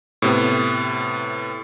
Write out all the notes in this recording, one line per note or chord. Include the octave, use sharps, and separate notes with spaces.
A2 C3 B3